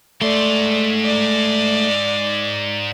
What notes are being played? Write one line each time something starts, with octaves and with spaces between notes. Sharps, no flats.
G#2 A3 D5 C6
D5